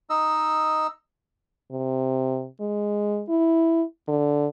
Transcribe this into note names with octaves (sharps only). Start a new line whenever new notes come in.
D#4 D#5 E6
C3
G#3
E4
D3